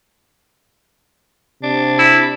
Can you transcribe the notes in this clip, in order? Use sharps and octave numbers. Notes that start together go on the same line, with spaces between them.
C3 D4
E4